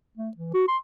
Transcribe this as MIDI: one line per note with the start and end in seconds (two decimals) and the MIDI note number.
0.17 0.30 57
0.37 0.53 52
0.54 0.64 66
0.68 0.77 84